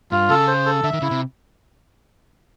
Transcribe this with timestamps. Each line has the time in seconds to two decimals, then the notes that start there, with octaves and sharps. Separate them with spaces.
0.11 G2 F4
0.29 C#3 A4
0.47 C5
0.66 A4
0.83 D3 E5
0.93 D#3
1.02 C#3 E4
1.11 C3